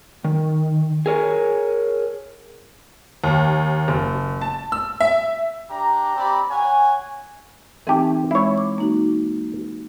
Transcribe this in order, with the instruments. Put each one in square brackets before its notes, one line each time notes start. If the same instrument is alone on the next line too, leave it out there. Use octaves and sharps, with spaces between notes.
[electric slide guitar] D#3
G#4 A#4 C#5
[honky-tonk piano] D#2
F#1
A5
E6
E5
[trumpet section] D4 G4 A#5
C4 G4 D5 A#5 B5
C#5 F#5 G#5
[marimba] E3 C4 D#4 [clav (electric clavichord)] A3 G4
[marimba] G#3 [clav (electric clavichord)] E4 C#5
[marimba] D6
A#3 D#4 F#4